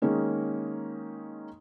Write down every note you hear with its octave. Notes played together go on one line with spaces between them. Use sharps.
D#3 G#3 A#3 C#4 D#4